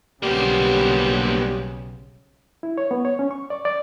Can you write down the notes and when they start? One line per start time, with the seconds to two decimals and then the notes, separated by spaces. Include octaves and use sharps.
0.23 B1 C#3 G3 A#3 B3 G4 C5
2.63 E4
2.78 C#5
2.91 B3
3.05 C#5
3.19 C#4
3.31 C#6
3.50 D5
3.65 D5